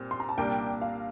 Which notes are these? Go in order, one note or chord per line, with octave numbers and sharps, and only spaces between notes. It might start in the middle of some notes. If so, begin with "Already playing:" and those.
Already playing: A#2 G3 C4
C6
A#5
A5
C2 A#2 G3 A#3 D4 G5
F5